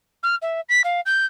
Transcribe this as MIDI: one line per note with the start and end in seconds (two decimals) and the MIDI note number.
0.23 0.36 89
0.42 0.61 76
0.69 0.82 95
0.84 1.01 77
1.06 1.26 91